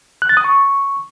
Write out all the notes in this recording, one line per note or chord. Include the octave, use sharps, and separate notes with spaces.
F#6
A6
D#6
C#6